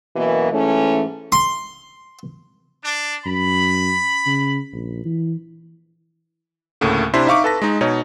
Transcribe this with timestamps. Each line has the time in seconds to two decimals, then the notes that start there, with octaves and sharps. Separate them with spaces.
0.16 F#2 B2 E3 A#3
0.52 G#2 E3 A3 C#4
1.32 C6
2.83 D4
3.26 F#2 B5
4.26 C#3
4.73 A#1
5.05 E3
6.81 D2 A2 C#3 A3 A#3
7.14 C3 D4 E4 C5 C6 B6
7.27 D#4 E5 F5 C#6 D6
7.44 A4 B4 A5 A#6
7.62 G#3 D#4
7.81 B2 D#4 C#5